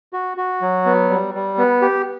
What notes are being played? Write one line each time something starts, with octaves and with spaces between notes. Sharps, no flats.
F#4
F#4
F#3
B3
G3
G3
B3
G4